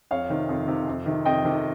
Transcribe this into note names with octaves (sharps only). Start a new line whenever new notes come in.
F2 C#5 F5
C3 D#3
F2
C3 D#3
F2
C3 D#3
F2 D#5 G5
C3 D#3